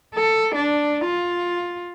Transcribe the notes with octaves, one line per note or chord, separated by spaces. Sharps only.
A4
D4
F4